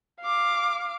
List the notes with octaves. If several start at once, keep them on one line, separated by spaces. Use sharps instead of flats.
F5 D6